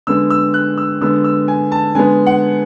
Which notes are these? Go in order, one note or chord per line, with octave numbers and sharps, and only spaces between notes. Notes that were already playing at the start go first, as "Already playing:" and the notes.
D3 G#3 B3 E6
E6
F#6
E6
D3 G#3 B3 E6
E6
G#5
A5
D3 G#3 B3 G#5
F#5